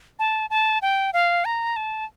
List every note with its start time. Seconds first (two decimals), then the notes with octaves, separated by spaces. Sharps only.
0.19 A5
0.50 A5
0.82 G5
1.13 F5
1.45 A#5
1.76 A5